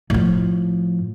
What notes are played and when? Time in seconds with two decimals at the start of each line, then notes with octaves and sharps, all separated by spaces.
0.10 A2 F3